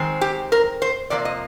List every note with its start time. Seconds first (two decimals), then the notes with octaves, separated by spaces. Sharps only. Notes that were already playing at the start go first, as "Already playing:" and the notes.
Already playing: D#3 G#3 C4
0.21 G4
0.52 A#4
0.82 C5
1.10 C3 F3 A#3 D5
1.25 D#5